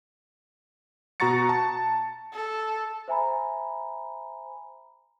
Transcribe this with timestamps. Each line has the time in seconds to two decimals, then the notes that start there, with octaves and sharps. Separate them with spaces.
1.20 B2 F#4 A#5 C#6 A6 C#7
1.49 A5
2.33 A4
3.08 C5 E5 G#5 A#5 B5